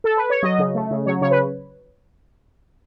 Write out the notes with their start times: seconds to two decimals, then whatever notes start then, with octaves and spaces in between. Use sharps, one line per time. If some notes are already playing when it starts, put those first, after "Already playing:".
0.04 A4
0.17 B4
0.30 C#5
0.43 F#3 D#5
0.59 C#3
0.75 A3
0.91 C#3
1.06 F#3 C#5
1.21 C#3 C#5
1.31 B4